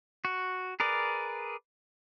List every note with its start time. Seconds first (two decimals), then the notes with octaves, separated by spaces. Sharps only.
0.25 F#4
0.80 G#4 A#4 B4 D5